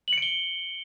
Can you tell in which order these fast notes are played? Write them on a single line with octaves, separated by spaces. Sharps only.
F#7 C#7 D7 G7